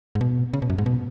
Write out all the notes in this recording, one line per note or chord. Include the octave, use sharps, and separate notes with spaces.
G#2
B2
C#3
B2
F#2
G#2
B2